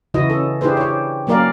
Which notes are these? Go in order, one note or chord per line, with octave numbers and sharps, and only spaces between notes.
C#3 E3 E4 F#4 D#5
C#4 A4
D4 E4 G4 G#4 B4 C5
G4 C#5
F#3 A#3 C#4 A#4 D5 F5